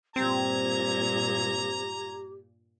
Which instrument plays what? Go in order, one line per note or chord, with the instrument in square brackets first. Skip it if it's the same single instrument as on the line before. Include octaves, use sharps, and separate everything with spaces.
[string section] G2 A#2 G#6 [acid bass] C4 [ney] G4 [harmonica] A#5